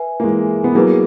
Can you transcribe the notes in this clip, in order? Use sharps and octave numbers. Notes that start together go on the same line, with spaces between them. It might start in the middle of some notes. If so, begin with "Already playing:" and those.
Already playing: B4 E5 G#5
A#3
E3 G#3
B3
F#3 A#3 E4 G#4 B4